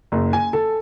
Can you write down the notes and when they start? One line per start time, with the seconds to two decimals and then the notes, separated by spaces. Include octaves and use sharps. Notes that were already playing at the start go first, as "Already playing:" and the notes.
0.12 F#1
0.33 G#5
0.53 A4